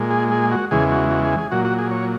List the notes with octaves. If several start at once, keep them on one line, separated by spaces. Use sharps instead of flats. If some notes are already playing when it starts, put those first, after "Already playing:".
Already playing: A#2 G#3
G#4
G#4
F#4
E2 C#3 E3 G#3 G#4
F#4
F#4
G#4
G#4
A#2 F#3 F#4
F#4
G#4
C#5